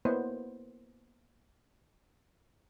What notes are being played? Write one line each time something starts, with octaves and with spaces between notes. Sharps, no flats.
A#3 B3 E4 C5 C#5 D#5